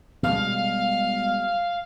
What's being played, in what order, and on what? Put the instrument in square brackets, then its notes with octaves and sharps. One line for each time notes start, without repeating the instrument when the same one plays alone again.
[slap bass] B2 G3 G#3 [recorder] F5